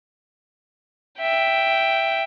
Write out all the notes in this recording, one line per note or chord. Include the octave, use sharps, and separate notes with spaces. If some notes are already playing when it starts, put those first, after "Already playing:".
E5 G5